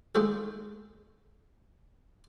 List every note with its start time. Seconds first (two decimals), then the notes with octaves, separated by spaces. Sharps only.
0.15 G#3 A3 D#4 F#4 A4